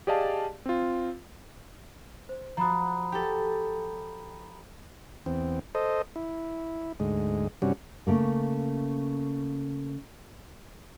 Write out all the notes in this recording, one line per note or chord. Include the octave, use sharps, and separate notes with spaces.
G4 G#4 D5 D#5 F5 A5
C4 F4
C5
F3 F#4 A#5 B5 D#6
G4 A4
E2 C4
A4 C5 D#5
E4
D2 G#2 G#3
G2 C3 G3 C#4 F#4
C#3 A3 A#3